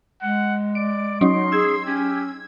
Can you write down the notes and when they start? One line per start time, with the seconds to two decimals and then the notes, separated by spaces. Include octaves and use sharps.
0.22 G#3 F#5
0.75 D5 D7
1.21 F#3 C#4 D#4 C6
1.52 G#4 E6 G#6
1.86 C#4 G4